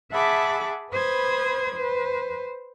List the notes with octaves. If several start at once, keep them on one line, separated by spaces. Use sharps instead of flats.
G#4 E5 F#5 A5 B5 D6
B4 C5 B5 D#6 G#6
B4 C5